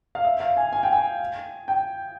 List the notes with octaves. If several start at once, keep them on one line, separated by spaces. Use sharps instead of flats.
F5
E5
F5
G#5
G#5
G5
G#5
G5